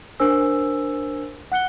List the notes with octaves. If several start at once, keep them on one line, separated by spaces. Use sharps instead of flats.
D4 A#4 C5 G#5 E6
F#5 F#6 C#7 G7